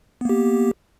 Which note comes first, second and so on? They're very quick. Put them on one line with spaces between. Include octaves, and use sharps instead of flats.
B3 A#3 G4